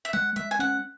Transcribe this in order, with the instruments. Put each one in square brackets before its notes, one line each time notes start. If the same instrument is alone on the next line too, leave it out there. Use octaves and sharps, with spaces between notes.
[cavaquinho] E5
[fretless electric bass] G#3 [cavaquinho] F#5
[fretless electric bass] G#3 [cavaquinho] E5
[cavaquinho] G#5
[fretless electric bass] C#4 [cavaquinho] F#5